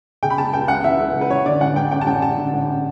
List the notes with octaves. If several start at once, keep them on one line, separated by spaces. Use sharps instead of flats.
C#3 G5
B5
C#3 A5
C#2 G5
C#2 F#5
E3 E5
C#2
C#2
B4
E3 C#5
D3 D5
A1 F#5
A1 G5
A1 G5
A5
A1 G5
A1 A5
D3
A1